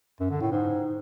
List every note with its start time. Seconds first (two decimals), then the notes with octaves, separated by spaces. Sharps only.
0.20 F#2
0.31 D3
0.41 A2
0.52 G#2